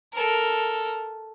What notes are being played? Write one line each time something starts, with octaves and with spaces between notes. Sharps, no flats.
A4 A#4